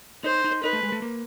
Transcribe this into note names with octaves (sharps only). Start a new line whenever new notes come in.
D#4 C5
D#4
D#4 B4
A3
G#3
A3
A#3